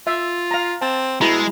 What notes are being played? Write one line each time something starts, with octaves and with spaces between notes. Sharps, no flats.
F4 E5
F5 A#5
C4 A5
B2 G#3 E4 A#5 B5